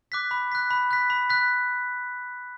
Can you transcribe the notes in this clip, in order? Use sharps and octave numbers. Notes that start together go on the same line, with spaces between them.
D6 F#6 B6
B5
F#6 B6
B5
F#6 B6
B5
F#6 B6